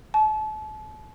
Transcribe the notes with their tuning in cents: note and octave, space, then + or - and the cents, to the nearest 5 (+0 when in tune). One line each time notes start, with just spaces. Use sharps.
A5 -35